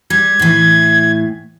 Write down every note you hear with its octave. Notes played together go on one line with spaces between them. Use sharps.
G3 G#6
A2 E3